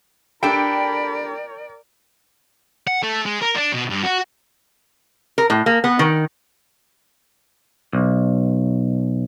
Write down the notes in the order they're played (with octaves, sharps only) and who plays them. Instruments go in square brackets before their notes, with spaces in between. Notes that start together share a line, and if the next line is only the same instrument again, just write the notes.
[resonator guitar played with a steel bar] D4 G4 A4 [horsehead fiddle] A#4 D5 [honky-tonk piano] G5 D7 [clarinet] B5
[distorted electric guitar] F#5
A3
G#3
A#4
D4
B2
G2
F#4
[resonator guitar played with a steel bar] A#4
A2
A#3
B3
D#3
[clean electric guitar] B1